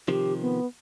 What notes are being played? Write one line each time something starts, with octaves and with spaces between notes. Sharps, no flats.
C3 D#3 F3 G4
B3